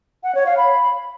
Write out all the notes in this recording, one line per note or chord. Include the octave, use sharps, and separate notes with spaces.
F#5
C#5
F5
B5